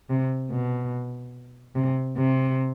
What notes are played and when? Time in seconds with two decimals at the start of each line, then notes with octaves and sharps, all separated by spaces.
0.10 C3
0.51 B2
1.75 C3
2.17 C3